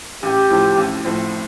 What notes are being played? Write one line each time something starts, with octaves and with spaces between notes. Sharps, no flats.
A1 G4
A2 F3 C4
A1
A2 F3 C4